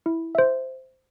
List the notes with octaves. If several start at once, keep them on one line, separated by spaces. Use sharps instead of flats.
E4
C5 E5